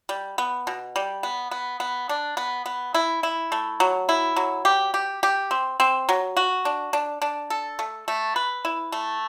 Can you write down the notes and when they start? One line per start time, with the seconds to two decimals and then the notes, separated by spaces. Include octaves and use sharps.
0.09 G3
0.38 B3
0.67 B2
0.96 G3
1.23 B3
1.51 B3
1.80 B3
2.09 D4
2.37 B3
2.66 B3
2.94 E4
3.23 E4
3.52 A3
3.80 F#3
4.09 E4
4.36 F#3
4.65 G4
4.94 G4
5.23 G4
5.51 C4
5.80 C4
6.09 F#3
6.37 F#4
6.65 D4
6.93 D4
7.22 D4
7.50 A4
7.79 A3
8.08 A3
8.36 B4
8.65 E4
8.92 A3